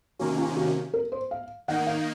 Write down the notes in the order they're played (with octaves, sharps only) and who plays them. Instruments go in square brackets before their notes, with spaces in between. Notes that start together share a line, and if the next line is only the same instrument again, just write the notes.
[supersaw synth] C3 D#3 A#3 C#4 [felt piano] F#4
[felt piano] F4
F#4
A#4
C5
F5
[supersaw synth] D#3 A#3 D#4 [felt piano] F#5
[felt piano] F5